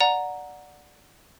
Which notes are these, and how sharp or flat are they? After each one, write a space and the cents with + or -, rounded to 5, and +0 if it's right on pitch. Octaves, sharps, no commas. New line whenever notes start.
D5 +0 F#5 -15 A#5 +0